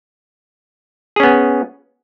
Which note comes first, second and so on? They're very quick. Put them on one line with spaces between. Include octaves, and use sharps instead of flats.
G#4 C#4 B3